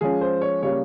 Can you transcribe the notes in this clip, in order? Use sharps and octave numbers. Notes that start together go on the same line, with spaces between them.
F3 G#3 C#4 G#4
C5
C#5
C#3 G3 A#3 C#5